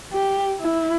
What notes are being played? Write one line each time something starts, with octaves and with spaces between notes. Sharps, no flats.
G4
E4